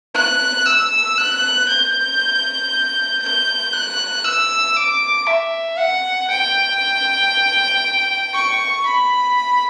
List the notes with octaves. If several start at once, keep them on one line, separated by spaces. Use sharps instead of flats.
F#6
E6
F#6
G6
G6
F#6
E6
D6
E5
F#5
G5
C#6
B5